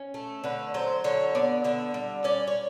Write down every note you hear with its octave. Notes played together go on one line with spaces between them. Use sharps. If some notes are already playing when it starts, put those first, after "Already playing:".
Already playing: C#4
A3
D3 B4
F#3 C5
D3 C#5
B3 D5
D3 E5
G3
C#4 D5
C#5